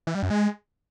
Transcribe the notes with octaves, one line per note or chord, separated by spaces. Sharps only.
E3
G3
F#2
G#3